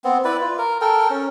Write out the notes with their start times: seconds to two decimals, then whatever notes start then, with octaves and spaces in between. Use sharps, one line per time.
0.04 B3 C4
0.24 E4 B4 D5
0.41 F4
0.58 A#4
0.81 A4 A#4 G5
1.10 C#4